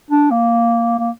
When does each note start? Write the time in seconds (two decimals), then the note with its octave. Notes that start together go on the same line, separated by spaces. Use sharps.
0.11 D4
0.31 A#3
0.99 A#3